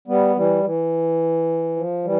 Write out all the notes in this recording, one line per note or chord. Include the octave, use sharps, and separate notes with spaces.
G3 B3
E3 G3
E3
F3
E3 G3